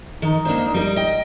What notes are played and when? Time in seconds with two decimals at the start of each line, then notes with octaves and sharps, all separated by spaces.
0.22 D#3 D#4
0.45 A#3 D4 C5
0.74 G3 A#4
0.96 D#5 G5